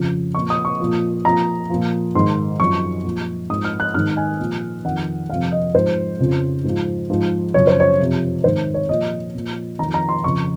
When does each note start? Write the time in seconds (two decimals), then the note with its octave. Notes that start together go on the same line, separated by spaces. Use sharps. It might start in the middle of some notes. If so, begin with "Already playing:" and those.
Already playing: F2 C#3 F3
0.35 A#2 F3 C#6
0.50 D#6
0.65 C#6
0.80 A#2 F3
1.25 A#2 F3 A#5
1.70 A#2 F3
2.15 G#2 D#3 C6
2.60 F#2 F3 C#6
3.04 A#2 F3
3.49 G#2 F3 D#6
3.65 F6
3.80 F#6
3.94 G#2 D#3 F6
4.17 G#5
4.39 A#2 F3
4.85 F2 D#3 F#5
5.29 F2 C3 F3 F5
5.52 D#5
5.74 G#2 F3 C5
6.19 F2 C#3 F3
6.64 G#2 F3
7.09 G#2 F3
7.54 F#2 C#3 F3 C#5
7.67 C5
7.80 C#5
7.99 F2 C3 F3
8.44 G#2 D#3 C5
8.74 C#5
8.89 A#2 F3 D#5
9.35 A#2 F3
9.79 D#3 A#5
9.83 F2
9.94 A#5
10.09 C6
10.24 F2 C#3 F3 C#6